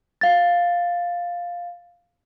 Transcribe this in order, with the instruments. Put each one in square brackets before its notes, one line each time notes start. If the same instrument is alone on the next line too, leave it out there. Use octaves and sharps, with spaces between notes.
[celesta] F5 A6